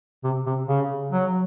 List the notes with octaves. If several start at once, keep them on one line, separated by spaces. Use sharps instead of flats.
C3
C3
C#3
F#3